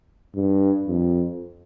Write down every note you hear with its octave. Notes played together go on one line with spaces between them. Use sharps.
G2
F2